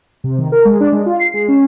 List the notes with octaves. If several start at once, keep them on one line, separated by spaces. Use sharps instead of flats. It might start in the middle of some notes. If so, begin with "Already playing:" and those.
C3
D#3
A#4
G#3
D4
G#3
F4
C7
G#3
C#4